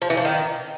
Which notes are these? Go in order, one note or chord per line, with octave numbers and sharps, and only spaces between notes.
F3
E3
F3
D#3